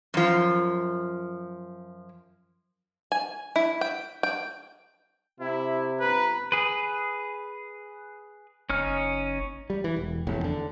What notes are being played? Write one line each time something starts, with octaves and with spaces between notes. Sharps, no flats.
F#2 F3
G#5
E4
G5
G5
C3 E4
G1 B4 A#5
G#4 B4
F#1 C#4 D#4 F6
G3
E3
E1
F1 E2 A2
D3